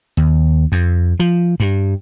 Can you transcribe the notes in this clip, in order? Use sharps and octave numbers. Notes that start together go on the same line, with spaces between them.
D#2
F2
F3
G2